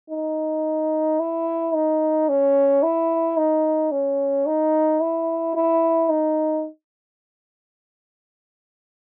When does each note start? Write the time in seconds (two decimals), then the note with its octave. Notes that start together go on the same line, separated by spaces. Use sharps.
0.11 D#4
1.20 E4
1.74 D#4
2.29 C#4
2.83 E4
3.37 D#4
3.92 C#4
4.46 D#4
5.01 E4
5.55 E4
6.10 D#4